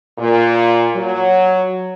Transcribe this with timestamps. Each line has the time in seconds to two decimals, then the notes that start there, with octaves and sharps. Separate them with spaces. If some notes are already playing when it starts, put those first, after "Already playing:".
0.19 A#2
0.95 F#3